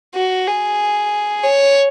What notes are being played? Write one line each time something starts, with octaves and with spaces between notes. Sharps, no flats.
F#4
G#4
C#5